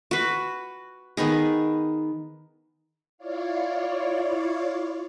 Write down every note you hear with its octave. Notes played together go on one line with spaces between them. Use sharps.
F#4 B4
D#3 B3 D#4 G#4
E4 F4 C#5 D5 F5